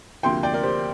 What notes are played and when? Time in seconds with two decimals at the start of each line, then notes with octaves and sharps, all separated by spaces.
0.23 D2 C3 F3 A#3 G5 C6
0.43 D5 G5
0.54 A#4 D5
0.63 G4 C5